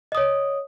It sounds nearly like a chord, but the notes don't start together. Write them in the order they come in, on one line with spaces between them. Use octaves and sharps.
D#5 D#6 C#5